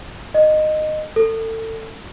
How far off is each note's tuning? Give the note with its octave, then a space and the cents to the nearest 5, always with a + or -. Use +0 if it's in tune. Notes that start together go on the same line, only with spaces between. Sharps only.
D#5 -15
A4 +30